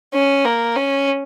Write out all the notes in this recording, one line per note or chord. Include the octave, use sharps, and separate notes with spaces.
C#4
A#3
C#4